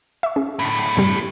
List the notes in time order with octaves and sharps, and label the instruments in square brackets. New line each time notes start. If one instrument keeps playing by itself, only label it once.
[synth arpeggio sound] E5 C#6
C#4 G#4
[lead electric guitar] D2 A2
[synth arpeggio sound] G2 C3 G3